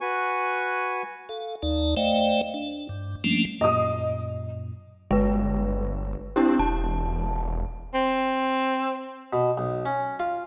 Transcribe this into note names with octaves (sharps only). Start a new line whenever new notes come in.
F#4 B4 G#5 C#6
A4 F5
D#2 D#4 D5 A5
A3 C5 D5 D#5 F5 G5
D4
G2
F3 G3 A3 A#3 C#4 D4
F#2 A#2 D#5 D#6
G1 G#3 B4
C4 D4 E4 G4
E1 A5
C4
B2
B1
C#4
F4